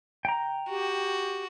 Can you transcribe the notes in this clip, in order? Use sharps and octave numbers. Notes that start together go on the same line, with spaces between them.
G5 A#5
F#4 G4